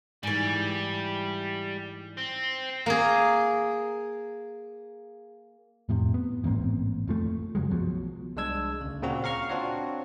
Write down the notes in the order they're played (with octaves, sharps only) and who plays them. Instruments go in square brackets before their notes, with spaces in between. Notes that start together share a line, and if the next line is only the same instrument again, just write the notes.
[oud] G#2 E3 [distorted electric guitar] G3
[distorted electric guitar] C4
[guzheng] A#3 G#4
[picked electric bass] F2 A2 C3
B3
A1 G#2 A#3 C4
F1 F3 A3
F#2 C#3 F#3 G#3
B1 B2 F3 F#3
[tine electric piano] C2 G#3 D4 E6 G#6
D2 C#3
A#2 C#3 C4 F#4
F5 A#5 C#6 F6
C4 D4 F4 F#4 C#5